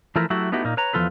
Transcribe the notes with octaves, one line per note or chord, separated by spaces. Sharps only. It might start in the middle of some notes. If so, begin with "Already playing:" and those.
E3 F3 A3 E4 A#4
F#3 A3 E4 F#4 G4
A3 B3 D#4 E4 F#4 G4
A#2 A#3 D#4
B4 C#5 A#5
E2 F3 F4 A4 B4